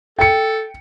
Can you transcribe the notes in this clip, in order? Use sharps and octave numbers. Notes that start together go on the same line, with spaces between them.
A4 G5 C#7